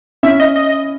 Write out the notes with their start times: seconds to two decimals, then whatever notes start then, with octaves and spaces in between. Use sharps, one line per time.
0.23 C#4 E4 E5
0.40 D#5
0.56 D#5